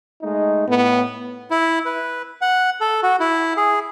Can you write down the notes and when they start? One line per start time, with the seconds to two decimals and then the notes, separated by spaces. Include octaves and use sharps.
0.22 G#3 A3 D#4
0.68 A2 B3
1.51 E4
1.85 B4
2.41 F#5
2.81 A4
3.03 F#4
3.20 E4
3.57 G#4